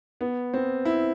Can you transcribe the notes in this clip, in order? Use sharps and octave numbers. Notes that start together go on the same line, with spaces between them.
B3
C4
E4